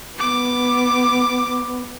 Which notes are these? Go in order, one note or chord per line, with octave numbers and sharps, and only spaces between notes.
B3 D6